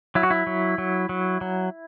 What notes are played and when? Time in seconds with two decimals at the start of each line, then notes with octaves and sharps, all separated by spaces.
0.15 F#3 E4
0.23 F#4
0.31 E4
0.47 F#3
0.78 F#3
1.09 F#3
1.41 F#3